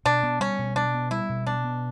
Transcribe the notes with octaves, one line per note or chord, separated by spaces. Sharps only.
B2 D4
B3
G3 C#4
B2
B2 D4
B3
G3 E4
B2
B2 D4
B3